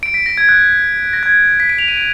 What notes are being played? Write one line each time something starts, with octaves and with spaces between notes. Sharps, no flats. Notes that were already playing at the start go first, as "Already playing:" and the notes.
D7
B6
A#6
G#6
F#6
A#6
G#6
B6
D7
F7
D#7
D7